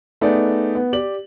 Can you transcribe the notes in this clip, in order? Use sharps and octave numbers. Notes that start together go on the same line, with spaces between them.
A3 B3 D#4 G#4 D5
B3
G4 D5 F#7